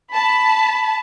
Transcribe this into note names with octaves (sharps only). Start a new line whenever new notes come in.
A5 B5